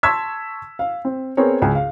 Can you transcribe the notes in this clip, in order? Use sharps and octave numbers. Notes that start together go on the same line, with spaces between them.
A5 C6 C#6 E6 G#6 B6
F5
C4
B3 C4 G#4 A#4 C#5
C#2 G#5
F5